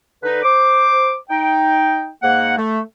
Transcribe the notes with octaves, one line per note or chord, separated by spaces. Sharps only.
D3 D#4 B4
C5 D6
D#4 G5
G#2 A#3 F#5
A3